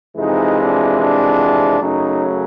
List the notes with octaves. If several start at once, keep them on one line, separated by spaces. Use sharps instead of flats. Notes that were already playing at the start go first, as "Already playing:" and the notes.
F2 C3 E3 G#3 D#4
D4
D4
F#2 C#3 F#3 A3 D#4